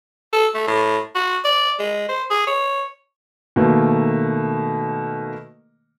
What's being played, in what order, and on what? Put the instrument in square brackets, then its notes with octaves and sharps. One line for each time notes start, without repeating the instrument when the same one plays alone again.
[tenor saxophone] A4
A3
A2
F#4
D5
G#3
C5
G#4
C#5
[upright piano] B2 D#3 A3 A#3